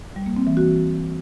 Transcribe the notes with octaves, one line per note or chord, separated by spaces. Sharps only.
G3
A#3
C4
E3
F#4